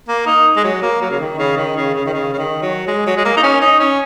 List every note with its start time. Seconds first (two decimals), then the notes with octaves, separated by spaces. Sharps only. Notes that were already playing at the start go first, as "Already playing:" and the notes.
0.09 A#3
0.27 D#4
0.57 G#3
0.64 F#3
0.82 A#3
1.02 F#3
1.11 C#3
1.20 D#3
1.39 C#3
1.57 D#3
1.76 C#3
1.94 C#3
2.06 D#3
2.14 C#3
2.33 C#3
2.38 D#3
2.62 F#3
2.88 G#3
3.06 F#3
3.17 G#3
3.25 A#3
3.37 D#4
3.43 C#4
3.61 D#4
3.80 C#4